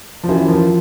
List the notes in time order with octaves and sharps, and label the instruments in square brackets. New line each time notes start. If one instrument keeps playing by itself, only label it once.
[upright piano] F3
[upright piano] E3 [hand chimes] C#4 F#4 A#4
[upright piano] F3